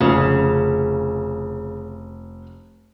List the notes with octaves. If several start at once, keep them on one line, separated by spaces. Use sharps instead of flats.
F1 C#3